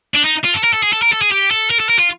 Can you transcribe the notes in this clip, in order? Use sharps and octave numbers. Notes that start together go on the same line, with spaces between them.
D4
D#4
F4
A4
A#4
A4
G#4
A4
A#4
A4
G#4
G4
A4
A#4
A4
A#4
F4